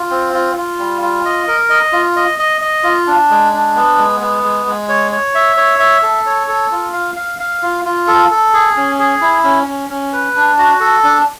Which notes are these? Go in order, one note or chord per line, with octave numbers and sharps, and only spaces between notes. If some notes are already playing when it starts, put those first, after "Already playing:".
Already playing: F4
C4
F4
F4
G3
F4
D#5
A#4
D#5
F4
D#5
D#5
D#5
F4
D4
G#3
D4
B3
G#3
B3
G#3
G#3
C#5
C#5
E5
C#5
E5
A4
C#5
A4
F4
F5
F5
F5
F4
F4
A4
A4
G#4
C#4
G#4
E4
C#4
C#4
C#4
B4
D4
F#4
A4
D4